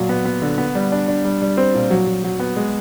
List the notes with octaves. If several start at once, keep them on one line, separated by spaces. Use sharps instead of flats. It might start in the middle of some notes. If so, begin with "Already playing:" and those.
Already playing: A#2 F#3
B3
B3
D3
B3
G3
D4
D4
G3
G3
C4
A#2
F#3
F#3
F#3
B3
G#3